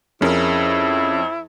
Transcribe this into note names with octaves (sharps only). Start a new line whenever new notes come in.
F2 C#4 E4 G#4 A#4